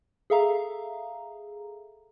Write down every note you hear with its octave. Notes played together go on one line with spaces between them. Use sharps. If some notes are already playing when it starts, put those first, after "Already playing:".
G#4 A4 E5 F5 A#5